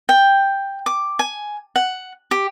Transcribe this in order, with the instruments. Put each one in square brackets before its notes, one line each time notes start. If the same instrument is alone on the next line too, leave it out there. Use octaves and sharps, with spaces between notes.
[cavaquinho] G5
D6
G#5
F#5
G4